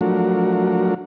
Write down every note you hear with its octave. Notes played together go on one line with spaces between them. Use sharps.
F3 F#3 A3 D4 F#4 A#4